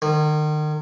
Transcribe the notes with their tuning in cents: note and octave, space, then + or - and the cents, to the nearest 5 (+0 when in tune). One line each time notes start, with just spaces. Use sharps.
D#3 -35